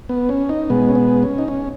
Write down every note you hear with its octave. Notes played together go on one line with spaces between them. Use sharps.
B3
C#4
D#4
B2 G#3 B3
C#4
B3
C#4
D#4
C#4